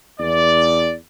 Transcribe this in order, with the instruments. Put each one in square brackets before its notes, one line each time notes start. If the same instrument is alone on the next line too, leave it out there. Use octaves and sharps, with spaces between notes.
[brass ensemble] E2 D5